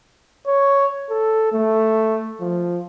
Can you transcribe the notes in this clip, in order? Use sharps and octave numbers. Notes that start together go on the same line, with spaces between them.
C#5
A4
A3
F3